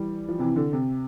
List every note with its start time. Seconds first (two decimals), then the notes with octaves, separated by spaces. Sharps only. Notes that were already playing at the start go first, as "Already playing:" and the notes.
Already playing: E3 G3
0.29 F3
0.39 C3 E3
0.56 D3
0.73 C3